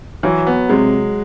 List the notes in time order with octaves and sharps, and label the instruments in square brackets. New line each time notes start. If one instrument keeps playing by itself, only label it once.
[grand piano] E3 [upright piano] F#3
[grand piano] B3
[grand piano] C3 [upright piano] G#3